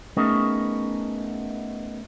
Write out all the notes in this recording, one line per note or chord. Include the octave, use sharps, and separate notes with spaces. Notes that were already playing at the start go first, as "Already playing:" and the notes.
A3 B3 C#4 D#4 G#4 A#4